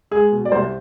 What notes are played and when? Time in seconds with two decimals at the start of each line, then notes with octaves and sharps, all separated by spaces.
0.11 G#3 G#4
0.32 B2
0.45 D5
0.52 C2 C5